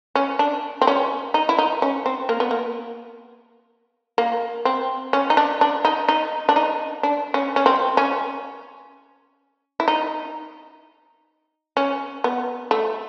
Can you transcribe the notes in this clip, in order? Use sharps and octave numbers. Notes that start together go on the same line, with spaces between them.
C#4
D4
C4
C#4
D#4
E4
D#4
C#4
C4
A#3
B3
A#3
A#3
C4
C#4
D#4
D4
D4
D#4
D#4
D4
D#4
D4
C#4
C#4
C4
C#4
E4
D#4
C#4
B3
A3